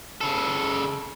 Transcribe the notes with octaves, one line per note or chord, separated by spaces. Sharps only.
C#3 A4